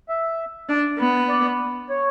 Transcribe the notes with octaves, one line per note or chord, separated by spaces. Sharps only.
E5
D4
B3
D5
C#5